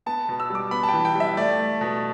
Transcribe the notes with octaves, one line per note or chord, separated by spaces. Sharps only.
B3 A5
B2
E6
G3
D6
B3 B5
A5
G5
E3
G5
G3
E5
A3 D5
A3
B2